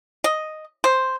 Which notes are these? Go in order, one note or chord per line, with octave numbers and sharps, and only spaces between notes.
D#5
C5